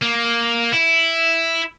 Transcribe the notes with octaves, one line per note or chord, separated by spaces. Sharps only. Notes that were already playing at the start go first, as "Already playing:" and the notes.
A#3
E4